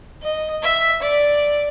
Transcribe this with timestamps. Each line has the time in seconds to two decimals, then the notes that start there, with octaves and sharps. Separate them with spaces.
0.23 D#5
0.63 E5
1.02 D5